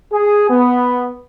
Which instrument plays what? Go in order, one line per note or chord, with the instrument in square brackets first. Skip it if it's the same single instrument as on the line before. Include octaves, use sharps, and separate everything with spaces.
[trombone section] G#4
B3